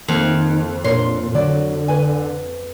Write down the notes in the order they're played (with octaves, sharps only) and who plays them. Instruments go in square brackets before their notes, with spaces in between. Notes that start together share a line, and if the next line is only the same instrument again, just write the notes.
[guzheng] F2 [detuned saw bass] D#3 [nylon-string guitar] A#3
[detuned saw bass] A#2 [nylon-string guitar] D4 A#4 C#5 [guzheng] C6
[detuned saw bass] D3 [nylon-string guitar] F#3 D5
[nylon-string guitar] B4 G#5